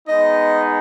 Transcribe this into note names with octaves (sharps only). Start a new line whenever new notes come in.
G#3 B3 D#4 D#5